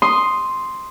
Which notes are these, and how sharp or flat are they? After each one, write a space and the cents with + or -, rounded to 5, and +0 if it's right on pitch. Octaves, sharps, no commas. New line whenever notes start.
C6 +0 D#6 +0